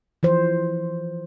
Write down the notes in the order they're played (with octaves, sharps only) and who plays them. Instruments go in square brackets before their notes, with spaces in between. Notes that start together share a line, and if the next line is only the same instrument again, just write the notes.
[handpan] E3 F3 C5